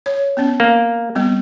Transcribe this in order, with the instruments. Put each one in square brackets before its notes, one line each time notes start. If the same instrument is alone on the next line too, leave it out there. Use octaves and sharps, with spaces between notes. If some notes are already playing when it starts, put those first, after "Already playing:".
[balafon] C#5
B3 C#4
[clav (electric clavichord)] A#3
[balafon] G3 B3 C4